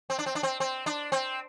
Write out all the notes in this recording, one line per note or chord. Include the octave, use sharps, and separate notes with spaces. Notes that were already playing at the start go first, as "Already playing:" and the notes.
C4
D4
C4
D4
C4
C4
D4
C4